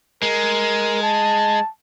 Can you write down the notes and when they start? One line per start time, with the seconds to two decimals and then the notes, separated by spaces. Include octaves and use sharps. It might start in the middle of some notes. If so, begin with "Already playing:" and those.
0.23 G#3 A#4
1.03 A5